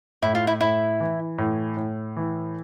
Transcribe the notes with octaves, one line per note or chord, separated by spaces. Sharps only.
A2 E4
F4
E4
A2 E4
E3
A2
A2
E3